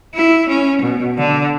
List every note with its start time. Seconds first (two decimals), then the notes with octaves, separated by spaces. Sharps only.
0.14 E4
0.48 C#4
0.81 B2
1.16 D3